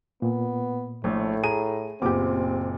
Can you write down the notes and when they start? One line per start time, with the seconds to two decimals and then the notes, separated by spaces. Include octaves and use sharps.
0.22 A#2 B3
1.04 A#1 A2 A3
1.44 G#4 A#5 D#7
2.02 F#1 A#2 B3 C4 G4 D6